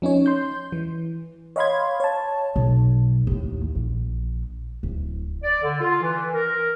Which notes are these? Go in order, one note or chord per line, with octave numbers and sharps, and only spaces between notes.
F3 C#4 D#4 C#5
C6 G6
E3
C#5 D#5 F5 B5 C6 G#6
C#5 A5
B1
D#2 A2
A#1
D1
D5
D3
F4
E3
A#4